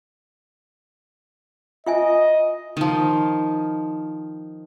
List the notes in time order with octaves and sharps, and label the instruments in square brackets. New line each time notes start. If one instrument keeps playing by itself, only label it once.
[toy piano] F4 E5 G#5 [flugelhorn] D#5
[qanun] D#3 F3